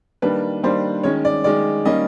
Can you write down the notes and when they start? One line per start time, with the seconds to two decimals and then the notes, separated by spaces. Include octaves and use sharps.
0.22 D#3 G3 A#3 D4 B4
0.63 D#3 G3 A#3 D4 C5
1.03 D#3 G#3 C#4 C#5
1.25 D5
1.44 D#3 G#3 C#4 D5
1.85 D#3 G3 A#3 C#4 D#5